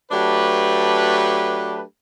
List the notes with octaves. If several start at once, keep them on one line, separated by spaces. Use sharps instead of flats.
F#3 A3 D4 G4 B4